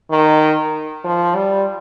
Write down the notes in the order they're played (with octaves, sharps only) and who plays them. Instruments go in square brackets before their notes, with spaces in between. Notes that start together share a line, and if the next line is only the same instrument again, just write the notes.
[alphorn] D#3
F3
G3